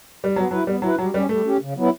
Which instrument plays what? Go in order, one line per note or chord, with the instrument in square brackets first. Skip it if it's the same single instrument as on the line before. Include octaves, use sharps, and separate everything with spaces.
[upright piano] G3
[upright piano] F#3 [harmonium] B3
[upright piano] F#3 [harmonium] B4
[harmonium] E4
[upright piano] G3 [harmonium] B3
[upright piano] F#3 [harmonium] E4 B4
[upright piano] F#3 [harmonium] G3
[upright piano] G3 [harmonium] C#4 G4
[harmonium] G3 [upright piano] A3
[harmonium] C#4 G4
C#3
F#3 B3 E4